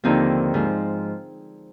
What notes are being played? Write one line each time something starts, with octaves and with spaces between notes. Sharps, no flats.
D#2 D3 F3 C4 D#4
G#2 F3